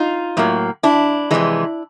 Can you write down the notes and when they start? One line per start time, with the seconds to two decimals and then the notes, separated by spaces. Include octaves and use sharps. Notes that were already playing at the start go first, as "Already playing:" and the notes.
Already playing: D#4 F4
0.37 A2 F#3 A#3
0.83 D4 E4
1.31 F2 C3 E3 G#3